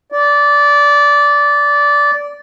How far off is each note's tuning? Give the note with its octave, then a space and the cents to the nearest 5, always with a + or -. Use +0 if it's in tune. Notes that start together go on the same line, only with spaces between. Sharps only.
D5 -15